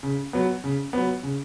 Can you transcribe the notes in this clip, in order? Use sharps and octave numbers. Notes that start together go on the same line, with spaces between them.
C#3
F#3 B3
C#3
F#3 B3
C#3